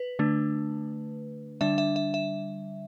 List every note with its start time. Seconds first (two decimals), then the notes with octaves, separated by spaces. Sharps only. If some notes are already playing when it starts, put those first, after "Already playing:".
Already playing: B4
0.19 D3 A3 D4
1.61 D3 G3 D4 E5
1.78 E5
1.96 E5
2.14 E5